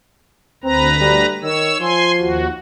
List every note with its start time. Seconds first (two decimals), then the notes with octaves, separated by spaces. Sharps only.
0.64 D2 C4 B4 A#5
1.01 G3
1.43 D#3 C#5 E6
1.80 F3 G#5 C6
2.19 D#2 F#4